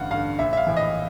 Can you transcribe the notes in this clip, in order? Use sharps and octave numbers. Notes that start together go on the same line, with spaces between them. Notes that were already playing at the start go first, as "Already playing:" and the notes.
Already playing: A1 G2 D3 F5 F#5
G2 D3 F5
A#1 E5
E5
F5
A2 E3
D#5